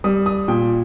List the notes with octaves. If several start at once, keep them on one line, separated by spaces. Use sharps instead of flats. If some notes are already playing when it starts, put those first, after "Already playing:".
G3 D#6
D#6
A#2 G5